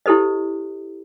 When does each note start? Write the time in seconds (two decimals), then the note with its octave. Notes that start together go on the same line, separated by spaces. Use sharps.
0.06 E4 G4 A4 C5 D#5